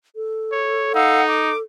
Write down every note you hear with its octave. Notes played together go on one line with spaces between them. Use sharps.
A4
C#5
D#4 F5 F#5 E6
D6